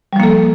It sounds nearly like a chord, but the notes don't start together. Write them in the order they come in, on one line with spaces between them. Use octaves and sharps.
G3 F3 A#3 A4